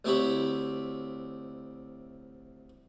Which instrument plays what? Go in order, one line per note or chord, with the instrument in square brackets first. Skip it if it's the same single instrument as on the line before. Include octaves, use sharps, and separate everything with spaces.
[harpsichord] D2 C4 E4 G4 C#5 B5